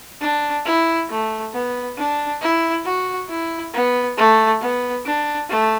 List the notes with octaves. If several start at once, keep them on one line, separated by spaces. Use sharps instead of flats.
D4
E4
A3
B3
D4
E4
F#4
E4
B3
A3
B3
D4
A3